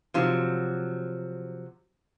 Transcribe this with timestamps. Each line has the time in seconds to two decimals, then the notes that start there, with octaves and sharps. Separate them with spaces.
0.14 C3 F3 F#3